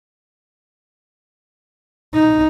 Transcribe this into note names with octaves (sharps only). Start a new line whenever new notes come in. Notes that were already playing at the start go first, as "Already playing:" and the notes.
D#4